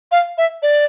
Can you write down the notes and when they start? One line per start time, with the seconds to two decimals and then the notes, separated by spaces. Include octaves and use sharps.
0.12 F5
0.38 E5
0.62 D5